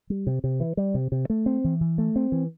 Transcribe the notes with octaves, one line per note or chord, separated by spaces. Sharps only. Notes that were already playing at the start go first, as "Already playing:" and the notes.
G3
C3
C3
E3
G3
C3
C3
A3
C4
E3
E3
A3
C4
E3